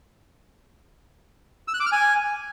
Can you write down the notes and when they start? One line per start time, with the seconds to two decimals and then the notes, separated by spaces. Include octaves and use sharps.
1.68 E6
1.74 F#6
1.80 D6
1.86 F6
1.92 G#5